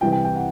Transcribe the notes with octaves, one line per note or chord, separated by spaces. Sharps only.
C2 C3 E3 G5
G5
G5
F#5